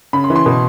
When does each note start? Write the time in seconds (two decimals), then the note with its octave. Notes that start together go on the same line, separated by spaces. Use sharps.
0.13 C#3 B5
0.24 C6
0.30 E3
0.36 C6
0.46 B2